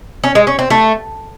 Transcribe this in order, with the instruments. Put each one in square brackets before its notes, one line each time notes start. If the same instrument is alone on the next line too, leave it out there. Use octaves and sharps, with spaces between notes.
[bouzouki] C#4
G#3
C#4
C4
A3